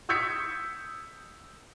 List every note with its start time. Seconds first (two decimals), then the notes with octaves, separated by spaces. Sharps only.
0.09 D#6 E6 G6 G#6 B6 C#7